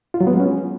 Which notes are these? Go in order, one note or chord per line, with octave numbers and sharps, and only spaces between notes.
F4
F#3
B3
G#3
C#4